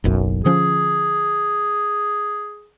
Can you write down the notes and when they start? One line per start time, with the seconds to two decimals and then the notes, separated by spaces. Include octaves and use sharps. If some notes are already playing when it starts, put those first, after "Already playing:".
0.04 F#1 B1 F#2
0.45 D3 F3 C#4 G#4